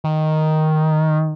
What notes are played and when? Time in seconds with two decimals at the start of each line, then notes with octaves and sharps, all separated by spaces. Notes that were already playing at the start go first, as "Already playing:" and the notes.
0.04 D#3